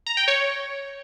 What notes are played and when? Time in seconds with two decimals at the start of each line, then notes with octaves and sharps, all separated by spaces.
0.07 A#5
0.17 G5
0.28 C#5